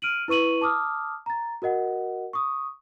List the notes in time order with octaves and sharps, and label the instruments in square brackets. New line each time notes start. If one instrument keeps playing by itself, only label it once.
[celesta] F6 D7 D#7 F#7
E4 B4 C#6 D#7 F#7
A5 D6 D#6 F6
A#5 A6
F#4 A#4 D#5 F#5
C#6 D#6